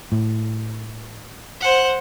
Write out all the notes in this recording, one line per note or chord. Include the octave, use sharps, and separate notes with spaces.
A2
C5 F#5